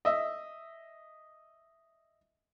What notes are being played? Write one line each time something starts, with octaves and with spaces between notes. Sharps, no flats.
D#5 E5